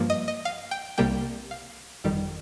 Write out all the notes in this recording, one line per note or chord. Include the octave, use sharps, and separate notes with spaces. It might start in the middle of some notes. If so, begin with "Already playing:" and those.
Already playing: G2 F3 A#3
D#5
D#5
F5
G5
C2 C3 G3 A#3 G5
F5
G1 F2 D#3 G3